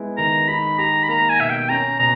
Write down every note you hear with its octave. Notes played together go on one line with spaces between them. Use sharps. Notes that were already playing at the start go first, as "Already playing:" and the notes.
Already playing: G#3 B3 E4
D#3 A#5
D#4 B5
G4 A#5
B5
A#3 A#5
G#5
B2 E5
G5
C#4 A#5
B2 A#5